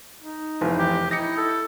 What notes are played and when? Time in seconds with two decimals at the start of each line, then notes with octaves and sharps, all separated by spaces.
0.22 D#4
0.61 F1 E2
0.79 G4
1.11 D#4 E4 A#6 C#7
1.37 A4